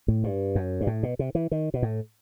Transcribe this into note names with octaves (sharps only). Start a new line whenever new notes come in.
A2
G2
F#2
G2
A2
B2
C3
E3
D#3
B2
A2